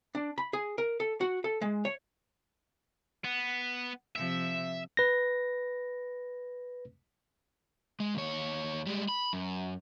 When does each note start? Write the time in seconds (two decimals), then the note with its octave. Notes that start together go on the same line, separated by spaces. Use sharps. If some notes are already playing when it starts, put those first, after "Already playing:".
0.15 D4
0.38 B5
0.53 G#4
0.78 A#4
1.00 A4
1.21 F#4
1.44 A4
1.61 G#3
1.85 C#5
3.24 B3
4.16 C3 F3 E5
4.97 B4 A#6
8.00 G#3
8.15 D#2 C#5
8.87 G3 G#3
9.09 B5
9.33 F#2